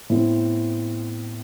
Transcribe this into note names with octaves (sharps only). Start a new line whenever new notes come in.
A2 B3 C4